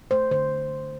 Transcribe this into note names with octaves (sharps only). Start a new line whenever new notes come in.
A3 C5
D3 C5